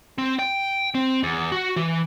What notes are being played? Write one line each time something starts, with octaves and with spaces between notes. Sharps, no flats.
C4
G5
C4
E2
F#4
E3